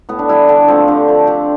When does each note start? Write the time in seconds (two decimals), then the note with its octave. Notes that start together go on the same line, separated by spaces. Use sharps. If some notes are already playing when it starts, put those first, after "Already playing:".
0.09 A2 B3
0.19 D4
0.29 E3 G3 E4
0.49 D3 D4
0.68 F3 A3 C4
0.88 D3 G4
1.08 F3 A3
1.27 D3 G4